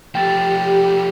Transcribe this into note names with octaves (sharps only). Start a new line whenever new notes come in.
F3 A3 G4 G5 A6